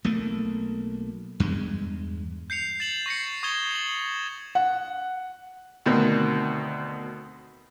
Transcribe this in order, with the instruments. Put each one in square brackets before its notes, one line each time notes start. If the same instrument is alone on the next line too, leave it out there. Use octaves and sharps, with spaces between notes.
[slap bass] B1 A3 A#3
E2 G2 G#3
[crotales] G6 C7 C#7 F7
A6 E7 F#7
C#6 A#6 C7 C#7
C#6 D#6 G#6 A6 E7 G7
E7 F#7
[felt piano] F#5
[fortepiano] D2 B2 D#3 C4